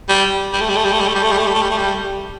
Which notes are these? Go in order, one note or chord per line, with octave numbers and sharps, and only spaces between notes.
G3
G3
A3
G3
A3
G3
A3
G3
A3
G3
A3
G3
A3
G3
A3
G3
A3
G3